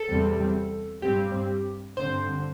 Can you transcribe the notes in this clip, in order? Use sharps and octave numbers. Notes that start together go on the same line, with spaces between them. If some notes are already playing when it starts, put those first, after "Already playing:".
Already playing: A4
E2 C3 G3 C4
G2 G3 C4 G4
G2 D3 C4 C5